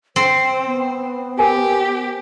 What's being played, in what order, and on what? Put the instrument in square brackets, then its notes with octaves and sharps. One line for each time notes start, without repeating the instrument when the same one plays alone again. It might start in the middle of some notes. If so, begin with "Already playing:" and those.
[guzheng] C4 [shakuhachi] C5
[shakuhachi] B3
[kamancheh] G4 [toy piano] A#4 G#5